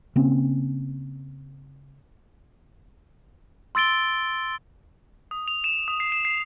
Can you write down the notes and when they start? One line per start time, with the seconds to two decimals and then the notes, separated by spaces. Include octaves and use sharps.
0.16 C#3 A#3 C4 C#4
3.75 C6 E6 A6 D7 G7
5.31 D#6
5.48 F7
5.64 E7
5.88 D#6
6.00 C7
6.12 E7
6.25 C7